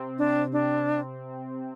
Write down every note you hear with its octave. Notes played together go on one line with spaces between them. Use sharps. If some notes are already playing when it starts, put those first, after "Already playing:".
Already playing: C3 C4
D4
D4